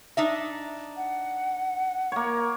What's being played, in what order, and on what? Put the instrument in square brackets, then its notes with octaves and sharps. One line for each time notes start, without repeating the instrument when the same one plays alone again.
[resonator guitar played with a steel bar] D4 D#4 E5
[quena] F#5
[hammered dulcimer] A#3 C#5